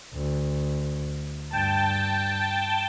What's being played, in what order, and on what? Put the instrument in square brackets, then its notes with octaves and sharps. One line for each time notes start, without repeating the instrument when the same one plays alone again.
[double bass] D2
[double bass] G2 [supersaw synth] G5 A5